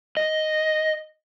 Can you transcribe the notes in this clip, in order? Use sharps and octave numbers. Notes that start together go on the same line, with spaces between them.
D#5